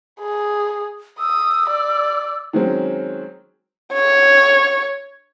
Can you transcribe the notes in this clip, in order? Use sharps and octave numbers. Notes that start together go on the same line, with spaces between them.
G#4
D#6 E6
D5
D#3 F#3 G#3 C4 C#4
C#5